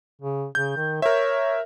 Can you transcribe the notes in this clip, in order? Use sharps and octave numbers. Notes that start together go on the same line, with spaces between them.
C#3
C#3 G6
D#3
A#4 C#5 E5